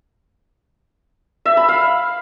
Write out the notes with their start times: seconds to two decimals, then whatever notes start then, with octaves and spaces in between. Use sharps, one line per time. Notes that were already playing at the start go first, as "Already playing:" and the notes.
1.46 E5
1.57 B5
1.69 F5